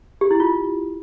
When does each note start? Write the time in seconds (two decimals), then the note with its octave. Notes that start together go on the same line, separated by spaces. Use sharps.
0.21 G4
0.31 E4
0.40 F4